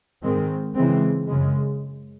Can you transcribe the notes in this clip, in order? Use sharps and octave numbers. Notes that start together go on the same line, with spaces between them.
G#2 D#3 G#3 C4
C#3 E3 G#3 C4
F#2 C#3 G#3